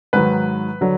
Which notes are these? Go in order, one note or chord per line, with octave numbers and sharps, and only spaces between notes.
G#2 D#3 F#3 B4
D3 F#3